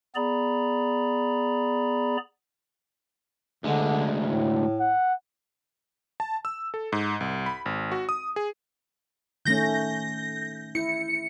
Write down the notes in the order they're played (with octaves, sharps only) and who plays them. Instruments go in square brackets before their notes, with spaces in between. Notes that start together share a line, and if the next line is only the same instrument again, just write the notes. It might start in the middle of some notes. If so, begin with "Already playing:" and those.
[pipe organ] B3 G#4 D5 A#5 B5
[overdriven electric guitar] D2 G#3 [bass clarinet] D3
[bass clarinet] A2
[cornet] F#5
[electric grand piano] A5
E6
A4
G#2
C2
B5
G#1
F#4
D#6
G#4
[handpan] D#3 A3 C#4 [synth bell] G6 A#6
[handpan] E4 [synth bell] C#7